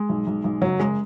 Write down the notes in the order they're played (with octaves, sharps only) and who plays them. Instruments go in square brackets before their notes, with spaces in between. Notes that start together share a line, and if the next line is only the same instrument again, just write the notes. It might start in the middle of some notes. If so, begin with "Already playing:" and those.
Already playing: [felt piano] G#3
B1
B1
B1
F#1 F#3
F#1 G#3